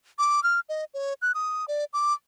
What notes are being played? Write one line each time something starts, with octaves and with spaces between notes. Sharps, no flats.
D6
F6
D#5
C#5
F#6
D#6
D5
D6